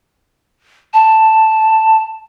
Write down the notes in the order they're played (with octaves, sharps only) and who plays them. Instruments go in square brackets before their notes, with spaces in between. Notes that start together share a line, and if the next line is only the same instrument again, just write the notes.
[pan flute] A5